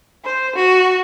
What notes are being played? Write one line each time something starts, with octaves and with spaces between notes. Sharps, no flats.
C5
F#4